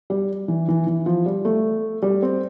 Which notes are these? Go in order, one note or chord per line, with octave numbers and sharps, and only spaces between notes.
G3
E3
E3
E3
F3
G3
A3
G3
C4